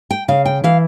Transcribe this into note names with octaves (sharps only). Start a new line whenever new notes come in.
G5
C#3 F5
G5
E3 F5